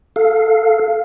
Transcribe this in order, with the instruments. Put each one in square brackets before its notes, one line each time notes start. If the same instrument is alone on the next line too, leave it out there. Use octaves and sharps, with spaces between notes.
[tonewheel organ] A4 F5